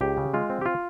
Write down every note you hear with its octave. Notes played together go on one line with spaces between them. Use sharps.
C#2 G4
C#3
G#3 F4
C4
G4
F4